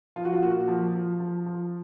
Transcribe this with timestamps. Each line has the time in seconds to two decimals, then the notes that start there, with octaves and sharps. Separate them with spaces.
0.16 F3 F4
0.25 F#4
0.33 F4
0.42 A#2 F#4
0.68 F3
0.95 F3
1.20 F3
1.46 F3